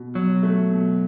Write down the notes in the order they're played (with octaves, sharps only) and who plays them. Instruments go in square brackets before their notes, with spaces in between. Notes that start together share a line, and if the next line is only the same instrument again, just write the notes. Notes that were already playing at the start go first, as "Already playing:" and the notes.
Already playing: [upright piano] B2
[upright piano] B2 [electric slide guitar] F#3
[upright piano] A3
B2